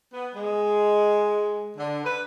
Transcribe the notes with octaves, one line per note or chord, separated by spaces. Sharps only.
B3
G#3
D3
B4